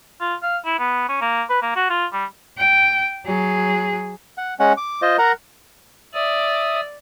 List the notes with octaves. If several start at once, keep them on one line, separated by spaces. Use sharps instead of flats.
F4
F5
E4
B3
C#4
A#3
B4
A#3
F#4
F4
G3
G5
F#3 G#4
F#5
G#3 C#4 F#5
D6
F4 C5 D#5
A#4 F#5 A#5
D5 E5 D#6